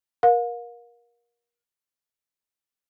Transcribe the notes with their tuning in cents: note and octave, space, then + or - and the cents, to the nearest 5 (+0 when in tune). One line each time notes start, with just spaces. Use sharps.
A#4 +25 F5 +35